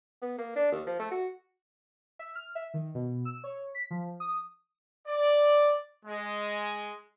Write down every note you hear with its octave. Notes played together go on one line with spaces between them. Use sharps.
B3
A#3
D4
D#2
F3
A3
F#4
E5
F6
E5
D#3
B2
E6
C#5
B6
F3
D#6
D5
G#3